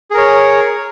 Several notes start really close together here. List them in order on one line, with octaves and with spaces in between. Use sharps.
G#4 A#4 C#5